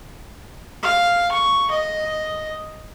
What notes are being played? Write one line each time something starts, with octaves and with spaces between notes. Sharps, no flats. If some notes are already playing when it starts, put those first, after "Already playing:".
F5
C#6
D#5